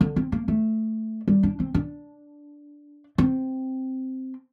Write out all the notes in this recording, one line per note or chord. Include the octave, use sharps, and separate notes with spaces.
D3
C4
A#3
A3
G3
D4
C4
D4
C4